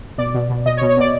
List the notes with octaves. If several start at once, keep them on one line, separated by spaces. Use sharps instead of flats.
B2 D5
B2
B2
B2 D#5
C#5
B2
C#5
B2 D5